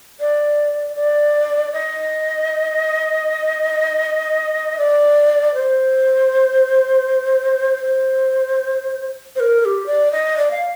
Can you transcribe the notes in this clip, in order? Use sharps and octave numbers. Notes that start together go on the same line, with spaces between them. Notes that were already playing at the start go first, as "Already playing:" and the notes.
D5
D5
D#5
D5
C5
C5
C5
A#4
A#4
G4
D5
D#5
D5
F5